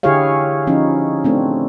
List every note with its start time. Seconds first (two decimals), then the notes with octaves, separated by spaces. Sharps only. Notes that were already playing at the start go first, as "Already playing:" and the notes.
0.03 D3 E4 G4 G#4 C#5 F5
0.67 F3 C#4 D#4 E4
1.24 A3 C4 D4